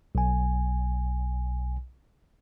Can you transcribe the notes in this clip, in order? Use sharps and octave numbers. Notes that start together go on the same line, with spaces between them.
B1 G#5